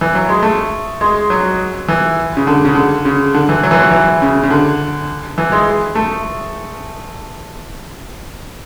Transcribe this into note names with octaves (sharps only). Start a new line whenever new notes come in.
E3
F#3
G#3
A3
G#3
F#3
E3
C#3
D3
C#3
D3
C#3
D3
E3
F#3
E3
F#3
E3
C#3
C#3
D3
E3
G#3
A3